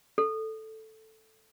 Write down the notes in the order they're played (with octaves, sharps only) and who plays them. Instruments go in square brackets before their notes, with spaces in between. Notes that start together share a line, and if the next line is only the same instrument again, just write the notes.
[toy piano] A4